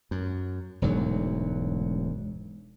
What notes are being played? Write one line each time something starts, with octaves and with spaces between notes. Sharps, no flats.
F#2
E1 D2 G#2 F#3